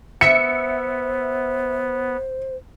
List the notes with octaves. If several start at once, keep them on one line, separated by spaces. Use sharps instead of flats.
B3 C5 E5 C#7